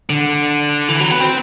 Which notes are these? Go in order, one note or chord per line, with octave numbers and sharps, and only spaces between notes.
D3
E3
F#3
B3
C4